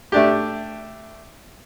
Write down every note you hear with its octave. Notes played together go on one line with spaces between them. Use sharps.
A3 D4 G4